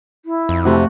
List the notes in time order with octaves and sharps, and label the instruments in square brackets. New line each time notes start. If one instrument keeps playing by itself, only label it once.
[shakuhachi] E4
[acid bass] F2
[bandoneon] C3 [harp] A3 F#4